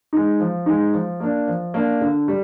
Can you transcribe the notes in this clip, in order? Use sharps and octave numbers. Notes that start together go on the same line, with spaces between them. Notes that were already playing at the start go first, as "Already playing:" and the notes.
G#3 D#4
F3
G#3 D#4
F3
A#3 D4
F3
A#3 D4
D3
G3